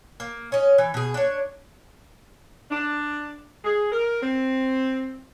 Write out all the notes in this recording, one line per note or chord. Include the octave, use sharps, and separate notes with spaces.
A#3
C#4 D#5
E3
B2 G#4
D4 C#5
D4
G#4
A#4
C4